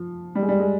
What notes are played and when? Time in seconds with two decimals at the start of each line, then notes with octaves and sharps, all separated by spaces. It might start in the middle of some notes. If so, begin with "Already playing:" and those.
Already playing: F3
0.35 G3
0.42 G#3
0.49 G3
0.60 G#3